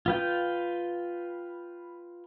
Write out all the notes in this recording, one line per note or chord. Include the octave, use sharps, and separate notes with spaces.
F4 B4 G5